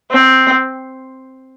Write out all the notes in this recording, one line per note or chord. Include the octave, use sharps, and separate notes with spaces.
C4